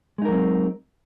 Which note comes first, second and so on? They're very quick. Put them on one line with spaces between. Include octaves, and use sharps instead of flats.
G#3 D#4 A#4 F#3 C4